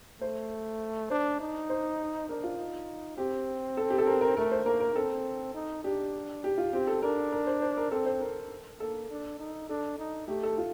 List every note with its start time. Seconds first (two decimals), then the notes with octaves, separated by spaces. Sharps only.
0.21 A3 C5
1.10 D4 C5
1.40 D#4
1.70 C5
2.29 D4 A#4
2.44 F4
2.58 D#4
3.17 C4 G4
3.77 A4
3.90 G4
3.98 A4
4.07 A#4
4.21 A#4
4.37 A3 A#4
4.51 C5
4.66 A#3 A#4
4.80 A#4
4.95 C4 A4
5.54 D#4
5.84 D4 G4
6.44 G4
6.58 F4
6.73 C4 G4
6.87 A4
7.02 D4 A#4
7.32 A#4
7.47 C5
7.62 C5
7.77 A#4
7.91 C4 A4
8.06 C5
8.21 A#4
8.80 A#3 A4
9.11 D4
9.39 D#4
9.69 D4 A4
9.99 D#4
10.28 A3 G4
10.43 A4
10.58 F4